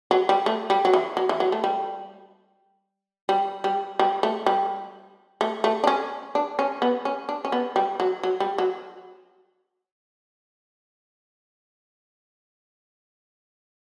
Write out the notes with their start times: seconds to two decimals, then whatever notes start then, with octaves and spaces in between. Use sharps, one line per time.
0.11 F#3
0.29 G3
0.46 A3
0.70 G3
0.85 F#3
0.93 E3
1.17 F#3
1.29 E3
1.40 F#3
1.52 A3
1.64 G3
3.29 G3
3.64 G3
3.99 G3
4.23 A3
4.46 G3
5.41 A3
5.64 A3
5.84 D4
5.87 C#4
6.35 D4
6.59 C#4
6.82 B3
7.05 C#4
7.29 D4
7.45 C#4
7.52 B3
7.76 G3
8.00 F#3
8.23 F#3
8.40 G3
8.58 F#3